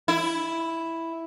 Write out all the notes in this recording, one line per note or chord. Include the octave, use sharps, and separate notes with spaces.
E4